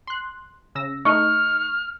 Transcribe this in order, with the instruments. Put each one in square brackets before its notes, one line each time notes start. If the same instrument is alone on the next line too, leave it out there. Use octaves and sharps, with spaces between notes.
[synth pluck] C6 F#6
C#3 E6 A#6
[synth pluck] A3 D#4 [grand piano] C#6 [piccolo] F6